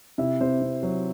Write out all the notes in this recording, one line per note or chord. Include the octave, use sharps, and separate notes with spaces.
C3 E4 E5
C3 C5
C3
F#3